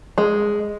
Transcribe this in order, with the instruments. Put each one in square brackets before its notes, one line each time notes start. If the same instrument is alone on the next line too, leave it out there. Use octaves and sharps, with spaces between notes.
[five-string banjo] G#3